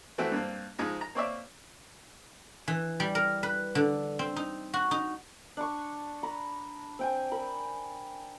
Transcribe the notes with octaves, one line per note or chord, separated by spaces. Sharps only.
E3 A3 C4 E4 F#4
G2 A#3 C4
G#2 F3 G#3 D#4 A#5
A#5
A#3 C4 C#5 D5 E5
E3
G3
A#4
B4
D3
C4
D#4
F#4
D#4
D4 C#6
A#5 B5
C4 G5 G#5
A#4 B5